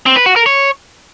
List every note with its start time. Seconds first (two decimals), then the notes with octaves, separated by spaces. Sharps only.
0.06 C4
0.16 B4
0.26 F#4
0.36 A#4
0.46 C#5